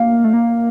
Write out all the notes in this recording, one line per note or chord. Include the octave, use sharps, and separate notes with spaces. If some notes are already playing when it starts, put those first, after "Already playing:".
Already playing: A#3 F5
A3
A#3